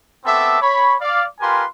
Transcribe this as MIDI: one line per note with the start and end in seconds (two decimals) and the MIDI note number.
0.25 0.61 57
0.25 0.61 59
0.25 0.61 60
0.25 0.61 69
0.25 0.61 76
0.25 0.61 86
0.61 0.94 73
0.61 0.94 83
1.01 1.25 74
1.01 1.25 77
1.40 1.64 65
1.40 1.64 67
1.40 1.64 70
1.40 1.64 71
1.40 1.64 80
1.40 1.64 84